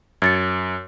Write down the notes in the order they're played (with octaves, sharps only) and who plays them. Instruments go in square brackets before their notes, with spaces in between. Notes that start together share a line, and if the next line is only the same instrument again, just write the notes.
[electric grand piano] F#2 [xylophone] G#6 A6 C#7